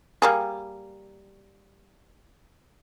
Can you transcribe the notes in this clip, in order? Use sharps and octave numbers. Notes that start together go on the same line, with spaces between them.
G3 A#3 G#4